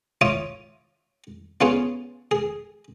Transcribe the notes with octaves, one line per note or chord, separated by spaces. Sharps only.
F4 C#5 E5 D6 D#6
B3 C#4 F4 G#4 C#5
G#4